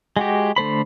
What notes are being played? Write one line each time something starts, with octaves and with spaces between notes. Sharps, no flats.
G#3 F#4 G4
D3 A3 C5 B5